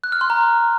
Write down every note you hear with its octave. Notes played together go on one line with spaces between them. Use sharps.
F#6
F6
C6
A#5